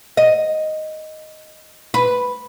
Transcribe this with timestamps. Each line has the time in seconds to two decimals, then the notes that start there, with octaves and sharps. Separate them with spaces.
0.17 D#5
1.94 B4